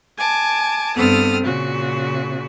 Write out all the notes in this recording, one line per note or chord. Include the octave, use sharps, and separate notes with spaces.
G#5 A5 D6
G2 B3 C4 A4 D#6 F6
A#2 C#3 F#4